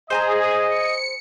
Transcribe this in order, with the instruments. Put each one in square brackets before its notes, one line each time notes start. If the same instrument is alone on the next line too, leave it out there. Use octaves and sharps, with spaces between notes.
[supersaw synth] G#4 [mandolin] C5 G#5 A#5 [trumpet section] D#5
[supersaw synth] C#7